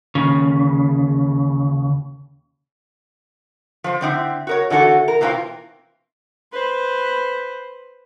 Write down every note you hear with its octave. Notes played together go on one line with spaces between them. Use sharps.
D#2 C#3
F3 C5
D3 C4 D#4 E4
F#4 A#4 C#5
D3 E3 F#4 A4 C#5
A#4
B2 E3 A#3 C4 F4
B4 C5